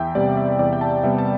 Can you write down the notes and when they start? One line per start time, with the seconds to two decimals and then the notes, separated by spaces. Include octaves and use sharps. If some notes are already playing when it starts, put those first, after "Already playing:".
Already playing: E2 E5 G5
0.15 C3 G3 B3 D5
0.37 E5
0.59 E2 D5
0.73 G5
0.81 A5
1.03 C3 G3 B3 E5
1.18 A5